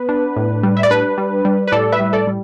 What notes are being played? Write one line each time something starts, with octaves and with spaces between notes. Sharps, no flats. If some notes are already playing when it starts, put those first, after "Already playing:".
Already playing: B3 B4
D4
A2
G3
E5
D5
D4 B4
G3
G3
B4
A2 A4 D5
B4 E5
G3
A4 D5
G3